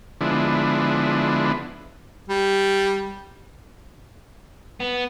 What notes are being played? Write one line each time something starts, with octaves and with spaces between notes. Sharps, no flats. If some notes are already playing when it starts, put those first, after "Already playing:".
D3 F3 G#3 B3 D4 E4
G3
B3